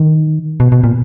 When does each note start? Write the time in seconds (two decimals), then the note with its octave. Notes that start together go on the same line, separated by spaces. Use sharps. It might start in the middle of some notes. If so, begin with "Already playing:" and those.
Already playing: D#3
0.60 B2
0.72 B2
0.84 A#2